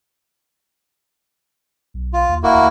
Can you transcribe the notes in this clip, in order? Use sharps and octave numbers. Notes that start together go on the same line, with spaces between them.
B1
F4
D#2
D#1 A#3 E4 F#4
D2